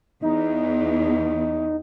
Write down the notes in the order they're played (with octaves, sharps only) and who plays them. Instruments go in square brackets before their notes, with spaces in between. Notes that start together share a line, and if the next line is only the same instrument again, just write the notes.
[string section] E2 [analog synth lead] D#4